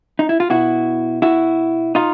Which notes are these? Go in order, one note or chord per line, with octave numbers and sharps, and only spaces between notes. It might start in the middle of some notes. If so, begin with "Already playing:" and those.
D#4
E4
F4
B2 E4 F#4
E4 F#4
D#4 F4